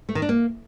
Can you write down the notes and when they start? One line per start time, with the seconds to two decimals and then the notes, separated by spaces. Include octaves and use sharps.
0.09 A3
0.15 D#3
0.22 D4
0.29 A#3